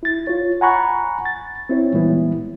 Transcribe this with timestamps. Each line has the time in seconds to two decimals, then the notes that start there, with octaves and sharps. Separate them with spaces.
0.03 E4 A6
0.27 F4 C#5
0.61 F#5 G#5 A#5 B5 C#6 F#6
1.25 A6
1.69 C4 E4 C#5
1.93 A#2 E3 G3 G#3 B3 E4